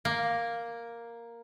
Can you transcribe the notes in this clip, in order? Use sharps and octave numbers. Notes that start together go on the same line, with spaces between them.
A#3